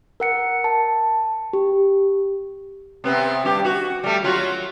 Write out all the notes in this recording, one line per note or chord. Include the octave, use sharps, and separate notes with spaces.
A#4 F#5 C#7
A5
G4
C3 B3 C4
G2 G4
F#4
G3 A3
F#3 F4 F#4